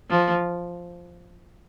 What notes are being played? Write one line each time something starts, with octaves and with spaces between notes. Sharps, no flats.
F3